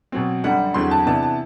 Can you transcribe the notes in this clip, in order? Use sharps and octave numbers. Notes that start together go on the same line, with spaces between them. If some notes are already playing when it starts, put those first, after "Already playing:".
B2 F#3 C4
F#2 D3 G3 F#5
E2 D3 F#3 C4 C6
A5
C3 E3 B3 D4 A5
A5